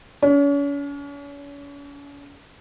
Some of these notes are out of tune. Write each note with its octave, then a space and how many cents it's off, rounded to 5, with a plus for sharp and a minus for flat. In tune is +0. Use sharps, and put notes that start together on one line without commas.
C#4 +40